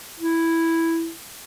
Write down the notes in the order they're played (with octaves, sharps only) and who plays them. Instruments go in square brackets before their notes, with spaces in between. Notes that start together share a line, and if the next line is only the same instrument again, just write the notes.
[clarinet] E4